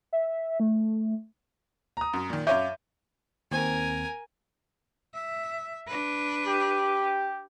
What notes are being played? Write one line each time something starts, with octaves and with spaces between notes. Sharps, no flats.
E5
A3
A#5 D#6
F#2
A#2 D#3
F#2 C#5 E5 F5 D6 G6 D#7
D#2 C4 A#4 G#5 G#6
E5
D4 B4
G4